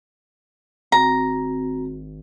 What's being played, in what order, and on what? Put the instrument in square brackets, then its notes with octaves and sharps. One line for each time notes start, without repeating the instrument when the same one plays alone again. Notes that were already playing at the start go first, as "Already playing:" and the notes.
[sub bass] G#1 [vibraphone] C4 F#4 [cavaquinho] A#5